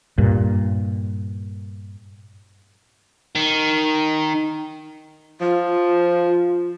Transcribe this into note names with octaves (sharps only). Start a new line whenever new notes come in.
G2 A#2
D#3
F3 F4